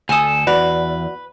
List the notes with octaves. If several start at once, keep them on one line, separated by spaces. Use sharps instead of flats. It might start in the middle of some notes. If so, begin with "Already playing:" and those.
D2 A4 G#5 D#6
E2 F#4 B4 D5